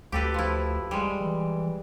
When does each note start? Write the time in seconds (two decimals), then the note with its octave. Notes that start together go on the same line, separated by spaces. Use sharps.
0.12 D2 G4 A4 B4
0.34 F3 E4
0.91 G3 G#3
1.20 E3